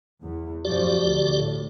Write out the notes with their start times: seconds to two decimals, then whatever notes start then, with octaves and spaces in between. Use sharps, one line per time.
0.23 E2
0.65 F#2 A2 F3 F#4 G4 D5
1.00 D2
1.38 A2